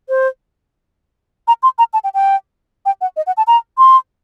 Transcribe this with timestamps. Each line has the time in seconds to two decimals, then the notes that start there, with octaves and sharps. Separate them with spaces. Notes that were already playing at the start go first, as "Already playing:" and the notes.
0.09 C5
1.48 A#5
1.63 C6
1.79 A#5
1.93 A5
2.04 G5
2.14 G5
2.86 G5
3.01 F#5
3.17 D#5
3.27 F#5
3.37 A5
3.47 A#5
3.78 C6